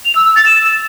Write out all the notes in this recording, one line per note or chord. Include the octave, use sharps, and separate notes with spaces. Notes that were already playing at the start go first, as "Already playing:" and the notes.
F7
E6
E6
A6
E7